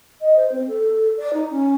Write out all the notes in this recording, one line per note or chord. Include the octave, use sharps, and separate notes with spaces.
D#5
C5
C4
A4
D5
D#4
C#4